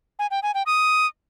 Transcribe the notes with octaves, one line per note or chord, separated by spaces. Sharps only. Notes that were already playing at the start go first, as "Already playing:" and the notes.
G#5
G5
G#5
G5
D#6